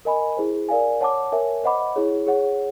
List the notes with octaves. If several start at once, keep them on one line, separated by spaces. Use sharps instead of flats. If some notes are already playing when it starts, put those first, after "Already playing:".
A#4 D#5 G#5 B5
E4 G#4 C5
A#4 D5 F5 G#5
C#5 F#5 A5 D6
A#4 C#5 E5 G#5
C5 D#5 F#5 B5 D6
E4 G#4 C#5
G#4 C#5 F#5